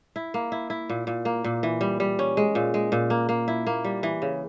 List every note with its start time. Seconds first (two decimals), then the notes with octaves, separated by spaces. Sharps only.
0.16 E4
0.34 A#3
0.52 E4
0.70 E4
0.90 A#2
1.07 A#2
1.25 A#3
1.44 A#2
1.63 E3
1.81 G3
2.00 G3
2.19 C#4
2.37 G#3
2.55 A#2
2.74 G#3
2.92 A#2
3.10 A#3
3.29 A#3
3.48 E4
3.67 A#3
3.84 G3
4.03 E3
4.22 C#3